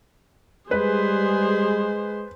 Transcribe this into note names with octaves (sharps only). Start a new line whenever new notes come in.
G3 G#3 G#4 B4 C5